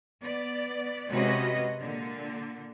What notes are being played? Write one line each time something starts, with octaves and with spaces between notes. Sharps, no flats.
B3 D5
C3 G#3 C#4 F#4 B4 D#5
A#2 D3